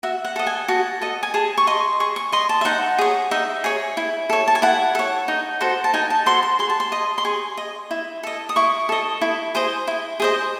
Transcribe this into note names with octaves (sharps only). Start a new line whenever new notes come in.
F#4 E5
F#5
A4 D#5
G#5
F#4 A5
A4 D#5
G#5
G#4 A5
C#6
D#5 C6
G#4 C#6
C#6
D#5 C6
A5
E5
D#4 F#5
G#4 C#5
D#4 E5
G#4 C#5
E4
A4 C#5
A5
G#5
E4 F#5
A4 C#5
D#4
F#4 A4 C5
A5
D#4 G#5
A5
F#4 A4 C5 C6
C6
G#4 C6
A5
C6
D#5
C6
G#4 C#6
D#5
E4
A4 D#5
D#6
E4 C#6
A4 D#5
E4
G#4 C5 D#5
E4
G#4 C5 D#5